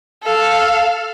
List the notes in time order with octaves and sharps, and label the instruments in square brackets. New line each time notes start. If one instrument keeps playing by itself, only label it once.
[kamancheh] A4 F5